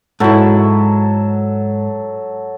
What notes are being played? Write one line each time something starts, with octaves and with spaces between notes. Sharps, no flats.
G#2 F#3 E4 A4